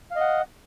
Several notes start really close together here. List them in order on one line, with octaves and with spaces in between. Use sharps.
F5 D#5 F#5